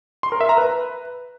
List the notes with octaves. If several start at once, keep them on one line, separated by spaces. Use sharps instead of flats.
C6
A#4
E5
A#5
B4